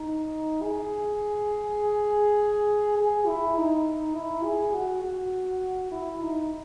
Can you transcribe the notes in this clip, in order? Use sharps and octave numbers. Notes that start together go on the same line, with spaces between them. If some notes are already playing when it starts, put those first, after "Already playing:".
Already playing: D#4
G#4
G#4
E4
D#4
E4
G#4
F#4
F#4
E4
D#4